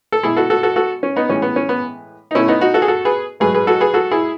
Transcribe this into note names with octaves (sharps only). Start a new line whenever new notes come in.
A4
B2 G#3 E4 G#4
F#4 A4
F#4 A4
F#4 A4
F#4 A4
C#4
B3 D#4
A2 E3 G#3 C#4
B3
C#4
B3
D#4
B2 A3 C#4 E4
B3 D#4
D#4 F#4
F#4 A4
G#4
F#4 A4
G#4 B4
G#2 F#3 A3 G#4 B4
G#4 B4
F#4 A4
G#4 B4
F#4 A4
E4 G#4